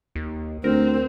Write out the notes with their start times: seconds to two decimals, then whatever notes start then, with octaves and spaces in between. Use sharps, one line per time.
0.16 D#2
0.64 D2 C4 A#4